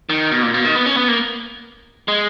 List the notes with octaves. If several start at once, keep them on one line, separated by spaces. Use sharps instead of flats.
D#3
B2
A#2
B2
D#3
B3
C#4
B3
A#3
G#3